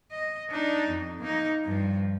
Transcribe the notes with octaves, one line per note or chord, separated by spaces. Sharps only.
D#5
D4 D#4
F2
A#3 D#4
G2 F3